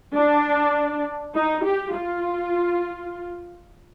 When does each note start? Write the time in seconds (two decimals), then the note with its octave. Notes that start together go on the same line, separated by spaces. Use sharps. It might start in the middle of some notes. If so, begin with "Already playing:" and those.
0.14 D4
1.35 D#4
1.66 G4
1.95 F4